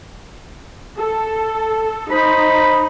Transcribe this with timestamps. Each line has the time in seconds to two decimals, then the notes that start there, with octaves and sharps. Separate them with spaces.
0.98 A4
2.10 D#4 C5 B5